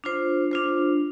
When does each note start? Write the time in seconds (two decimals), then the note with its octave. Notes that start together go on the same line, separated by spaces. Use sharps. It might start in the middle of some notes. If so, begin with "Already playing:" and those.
0.04 D4 F4 C5
0.51 D4 F4 C5